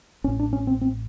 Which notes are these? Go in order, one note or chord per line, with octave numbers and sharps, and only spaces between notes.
A1 A2 C#4
D4
C#4
C4
C4